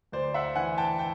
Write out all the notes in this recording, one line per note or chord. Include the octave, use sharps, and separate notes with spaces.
D2 C5 D5
E5 F#5
E3 F#5 G#5
G5 A5
G5 A5